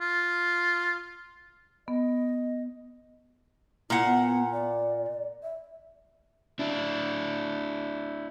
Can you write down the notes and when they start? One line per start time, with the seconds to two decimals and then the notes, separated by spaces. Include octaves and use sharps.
0.01 F4
1.88 B3 D#5
3.90 A#2 E4 F#5
4.06 B3
4.52 D5
5.43 E5
6.59 D4 E4